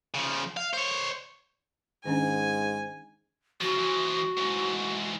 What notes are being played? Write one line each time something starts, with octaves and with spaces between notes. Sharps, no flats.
C#3 F3
F5
C5 C#5
G#2 D#3 C#4 D4 G#5
C#3 F3 F#4
E3 F3
G#2 E3